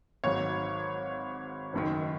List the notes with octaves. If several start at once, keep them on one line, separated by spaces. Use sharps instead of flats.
G#1 G#2 F#3 C#5
F#1 F#2 D#3